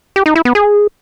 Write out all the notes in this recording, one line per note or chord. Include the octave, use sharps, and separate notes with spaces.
G4
D#4
E4
B3
G#4